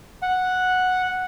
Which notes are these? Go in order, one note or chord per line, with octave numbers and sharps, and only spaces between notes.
F#5